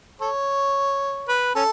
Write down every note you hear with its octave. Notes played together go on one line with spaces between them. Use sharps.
A4 C#5
B4
C#4 A4